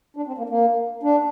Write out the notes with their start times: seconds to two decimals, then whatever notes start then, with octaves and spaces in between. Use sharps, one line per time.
0.17 D4
0.27 C4
0.38 A#3
0.49 A#3
1.03 D4